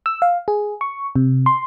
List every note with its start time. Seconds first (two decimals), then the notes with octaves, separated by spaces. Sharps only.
0.06 E6
0.22 F5
0.48 G#4
0.81 C#6
1.16 C3
1.46 C6